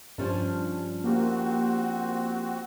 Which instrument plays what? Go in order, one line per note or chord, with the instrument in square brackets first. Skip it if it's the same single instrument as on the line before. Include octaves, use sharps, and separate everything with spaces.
[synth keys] G2 [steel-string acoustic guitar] F3 C#4 D4
[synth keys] A#3 G4 [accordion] C4 F#4